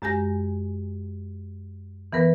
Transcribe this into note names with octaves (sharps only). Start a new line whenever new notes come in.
F#2 G#3 G4 G#5 A#6
E3 B3 A#4 B4